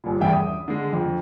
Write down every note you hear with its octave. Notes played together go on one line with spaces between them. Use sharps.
G1 A#2
F#1 E2 G2 E5 G5
D#6
D3 G#3
F2